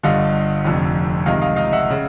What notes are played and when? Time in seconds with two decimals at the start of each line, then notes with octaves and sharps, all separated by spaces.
0.03 G1 G2 D3 D#5 F5
0.64 F1 F2 D3
1.26 C#2 C3 D#3 D#5 F5
1.41 D#5 F5
1.56 D#5 F5
1.72 E5 F#5
1.90 C#3